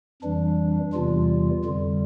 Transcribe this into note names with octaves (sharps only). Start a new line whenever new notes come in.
F2 E3 G3 D4
E2 C3 E3 G3 F4
F2 D3 G3